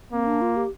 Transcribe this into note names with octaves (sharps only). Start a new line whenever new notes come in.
A#3 C4
D4
F4
G4